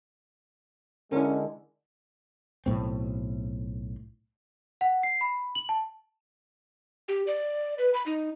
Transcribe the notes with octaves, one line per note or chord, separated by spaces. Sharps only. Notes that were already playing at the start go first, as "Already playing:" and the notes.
D3 G#3 C#4 E4 A#4
B1 A2 C4
F#5
C7
B5
F#7
A5
G4
D5
B4
B5
D#4